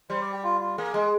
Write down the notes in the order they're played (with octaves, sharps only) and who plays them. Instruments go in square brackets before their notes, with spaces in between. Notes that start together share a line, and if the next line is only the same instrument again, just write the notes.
[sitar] G3 [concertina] C5
[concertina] D5
G4
F4
F4
[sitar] A#3 [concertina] G#4
[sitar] G#3